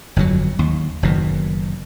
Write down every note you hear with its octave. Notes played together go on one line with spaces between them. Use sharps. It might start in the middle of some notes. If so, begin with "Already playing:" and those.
G1 F2 C#3 F#3
D#2
F#1 B2 D#3